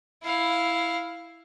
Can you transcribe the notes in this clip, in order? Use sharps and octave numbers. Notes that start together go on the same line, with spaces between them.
E4 F5